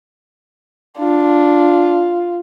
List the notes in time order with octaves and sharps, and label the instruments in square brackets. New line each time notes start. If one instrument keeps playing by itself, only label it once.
[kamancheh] D4 [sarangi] F4